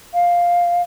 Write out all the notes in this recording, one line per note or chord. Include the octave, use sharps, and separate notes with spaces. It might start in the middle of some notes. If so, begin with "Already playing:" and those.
F5